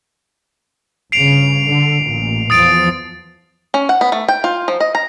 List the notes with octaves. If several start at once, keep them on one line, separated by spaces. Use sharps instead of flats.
G1 C#3 C7 D7 F7
D3
A1 A#2
E2 F3 D#6 A6 D7
C#4
F#5
B3
A3
G5
F4
F3
D#5
A#5